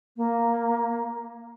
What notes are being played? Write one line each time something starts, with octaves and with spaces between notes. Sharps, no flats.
A#3